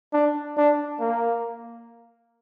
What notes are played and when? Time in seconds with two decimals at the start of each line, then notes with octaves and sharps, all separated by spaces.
0.14 D4
0.57 D4
1.00 A#3